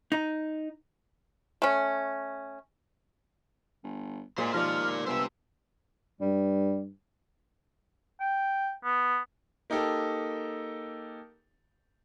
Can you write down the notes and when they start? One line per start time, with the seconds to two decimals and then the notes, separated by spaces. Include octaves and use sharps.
0.12 D#4
1.62 A3 C#4
3.84 G1
4.38 A#2 G#3 G#4 C5
4.54 D#2 F3 F4 A#4 D5 F6
5.07 G1 G2 G4 C5 E6
6.21 G2 G3
8.20 G5
8.84 B3
9.70 A#3 D#4 G4 A4